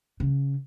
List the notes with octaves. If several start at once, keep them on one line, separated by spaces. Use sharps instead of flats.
C#3